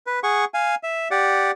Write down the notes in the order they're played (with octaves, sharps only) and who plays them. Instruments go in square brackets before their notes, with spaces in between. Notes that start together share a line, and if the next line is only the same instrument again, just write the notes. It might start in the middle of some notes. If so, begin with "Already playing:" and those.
[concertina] B4
G#4 F#5 C#6
F5 G#5
E5
G4 D5 F#5